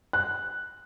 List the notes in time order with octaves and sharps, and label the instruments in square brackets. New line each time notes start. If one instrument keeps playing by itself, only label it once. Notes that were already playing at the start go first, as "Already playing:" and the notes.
[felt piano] F#6